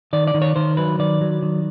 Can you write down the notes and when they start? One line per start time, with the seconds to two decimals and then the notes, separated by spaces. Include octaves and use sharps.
0.13 D#3 D5
0.27 D5
0.34 D#3
0.42 C#5
0.56 D#3 C5
0.77 F#3 B4
0.99 D#3 D5
1.21 F#3
1.43 D#3